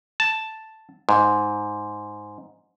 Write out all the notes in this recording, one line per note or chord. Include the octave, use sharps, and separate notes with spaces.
A5
G#2